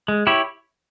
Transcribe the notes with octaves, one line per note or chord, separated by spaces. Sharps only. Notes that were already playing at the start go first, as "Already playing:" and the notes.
G#3
E4 G4 C#5